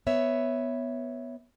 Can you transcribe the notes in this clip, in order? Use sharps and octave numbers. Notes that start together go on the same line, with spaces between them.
B3 C#5 E5